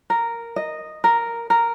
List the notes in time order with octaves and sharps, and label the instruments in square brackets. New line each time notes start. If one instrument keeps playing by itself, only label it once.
[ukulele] A#4
D#5
A#4
A#4